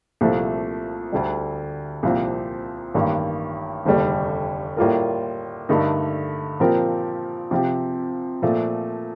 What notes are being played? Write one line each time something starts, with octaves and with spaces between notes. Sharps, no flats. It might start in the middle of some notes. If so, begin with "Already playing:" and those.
C2 A#2 F3 A3
D2 D3 G3
C2 A#2 F3 C4
A1 G2 D#3 A#3
F1 D#2 D3 G3
A2 G3 A#3 F4 A#4
G2 D3 A3 D#4 A#4
A#2 F3 C4 G4 A#4
C3 F3 C4 G4
A#2 F3 A3